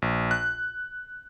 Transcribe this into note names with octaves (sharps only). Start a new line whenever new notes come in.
A#1
F#6